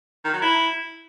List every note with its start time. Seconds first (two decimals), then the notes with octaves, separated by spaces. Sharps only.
0.25 D#3
0.33 F#3
0.42 E4